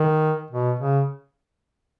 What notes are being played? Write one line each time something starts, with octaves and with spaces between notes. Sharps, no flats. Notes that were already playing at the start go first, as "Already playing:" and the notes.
Already playing: D#3
B2
C#3